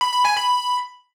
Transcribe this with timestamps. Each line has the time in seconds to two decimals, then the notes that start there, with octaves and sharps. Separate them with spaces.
0.01 B5
0.13 B5
0.25 G#5
0.37 B5